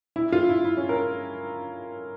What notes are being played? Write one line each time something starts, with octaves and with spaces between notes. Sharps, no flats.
E4
F4
E4
E4
C#4
A#4